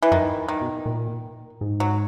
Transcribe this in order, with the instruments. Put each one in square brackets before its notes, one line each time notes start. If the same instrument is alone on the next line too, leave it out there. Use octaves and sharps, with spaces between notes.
[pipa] E3
[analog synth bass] F#2 [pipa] D#3
[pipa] D#3
[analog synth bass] B2
A#2
G#2
[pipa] F#3